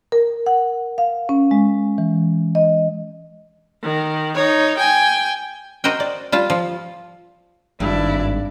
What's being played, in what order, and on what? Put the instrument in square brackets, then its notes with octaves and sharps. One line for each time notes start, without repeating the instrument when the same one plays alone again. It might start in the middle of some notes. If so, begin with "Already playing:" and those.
[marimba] A#4
F#5
F5
C#4
G#3
E3
D#5
[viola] D#3
D#4 C#5
G5 G#5
[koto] F#4 A#4 C5 D#5 F#5 G5
D5
G3 F4 A5
F3
[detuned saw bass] G#1 [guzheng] G2 [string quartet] E4 D5 A5